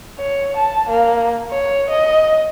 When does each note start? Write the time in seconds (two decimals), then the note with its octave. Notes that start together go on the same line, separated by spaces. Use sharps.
0.19 C#5
0.56 A5
0.89 A#3
1.51 C#5
1.90 D#5